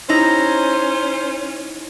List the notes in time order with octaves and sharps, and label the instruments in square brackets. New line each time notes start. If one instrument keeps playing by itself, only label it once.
[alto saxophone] C#4 [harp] D#4 E4 G4 [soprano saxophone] C5 [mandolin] A#5